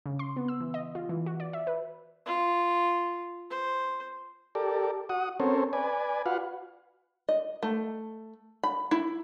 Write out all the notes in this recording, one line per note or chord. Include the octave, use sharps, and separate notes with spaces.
C#3
C6
B3
E6
E3
D#5
F4
E3
F#4
D5
E5
B4
F4
C5
G4 A4 A#4 D5
F#4 F#5 D#6
C4 C#4 A4 A#4 C5 C#5
B4 D5 G#5
F4 F#4 B4 F5 F#5
D#5
A3
B5
E4